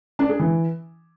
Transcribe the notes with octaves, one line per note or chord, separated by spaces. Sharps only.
D4
G#4
E3